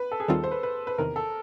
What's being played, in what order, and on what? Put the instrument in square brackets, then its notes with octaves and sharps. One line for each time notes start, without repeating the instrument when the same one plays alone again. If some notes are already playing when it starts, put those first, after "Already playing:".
Already playing: [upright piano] B4
A4
G#4
[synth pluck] D#2 D#3 G3 C4 F4 [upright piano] A4
[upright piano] C5
B4
B4
B4
[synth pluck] E2 C3 D#3 [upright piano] A#4
[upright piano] A4